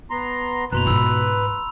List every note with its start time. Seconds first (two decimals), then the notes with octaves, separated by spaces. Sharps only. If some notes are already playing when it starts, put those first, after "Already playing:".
0.11 B3 A#5 C6
0.72 F#1 B2 B4 A#5 C6 F#6 F7
0.86 G#2 F4 B5 E6